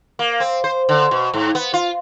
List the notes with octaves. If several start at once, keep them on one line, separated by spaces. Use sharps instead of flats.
A#3
C4
C5
D3
B2
G#2
B3
F4